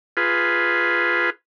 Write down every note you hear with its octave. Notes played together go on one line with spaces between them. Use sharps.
F4 G#4 B4